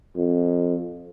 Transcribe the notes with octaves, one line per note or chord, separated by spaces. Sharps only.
F2